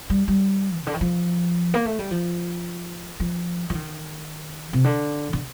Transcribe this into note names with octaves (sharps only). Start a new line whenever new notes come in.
G3
G3
C3
D3
D#3
F3
A#3
A3
G3
F3
F3
F3
D#3
C3
D3
D3